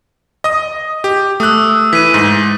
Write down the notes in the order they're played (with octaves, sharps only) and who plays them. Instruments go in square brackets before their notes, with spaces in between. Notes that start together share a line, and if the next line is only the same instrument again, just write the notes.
[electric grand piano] D#5 D#6
G4
[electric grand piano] A3 F#6 [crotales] D#6 E6
[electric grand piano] E3 [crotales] B6 D#7
[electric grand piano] G#2